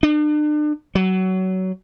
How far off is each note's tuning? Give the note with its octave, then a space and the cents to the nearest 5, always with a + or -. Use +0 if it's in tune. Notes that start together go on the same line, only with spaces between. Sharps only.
D4 +40
F#3 +20